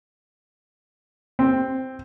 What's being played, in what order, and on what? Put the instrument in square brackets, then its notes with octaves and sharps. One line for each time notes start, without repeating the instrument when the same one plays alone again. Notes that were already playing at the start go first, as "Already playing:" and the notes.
[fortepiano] C4